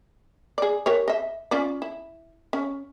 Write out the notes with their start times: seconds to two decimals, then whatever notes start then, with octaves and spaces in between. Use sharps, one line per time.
0.58 G#4 D5
0.86 G4 A#4 C#5
1.08 D#5 E5
1.51 C#4 F4 D5
1.82 E4
2.53 C#4